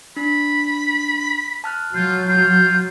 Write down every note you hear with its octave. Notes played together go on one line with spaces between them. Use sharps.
D4 B5
A5 F6 F#6
F#3 F4 G6
F4 G6